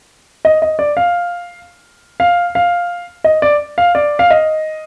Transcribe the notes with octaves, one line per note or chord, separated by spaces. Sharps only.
D#5
D#5
D5
F5
F5
F5
D#5
D5
F5
D5
F5
D#5